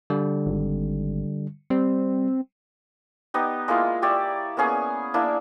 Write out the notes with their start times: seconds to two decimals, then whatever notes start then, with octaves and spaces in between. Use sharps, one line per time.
0.10 D3 G3
0.46 G#1
1.70 G3 C4
3.34 B3 D#4 G4
3.68 G#3 A#3 E4 F4
4.02 G4 C#5 D5 E5
4.57 A#3 B3 C#4 G#4
5.14 A#3 D4 E4